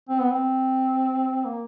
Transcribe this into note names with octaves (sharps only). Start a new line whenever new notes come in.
C4
B3
C4
A#3